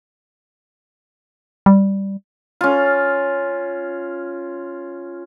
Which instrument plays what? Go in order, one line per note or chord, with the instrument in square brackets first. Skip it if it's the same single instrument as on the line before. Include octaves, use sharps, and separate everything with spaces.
[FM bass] G3
[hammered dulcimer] C#4 F4